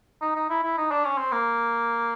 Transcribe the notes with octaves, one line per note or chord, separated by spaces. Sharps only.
D#4
D#4
E4
E4
D#4
D4
C#4
C4
A#3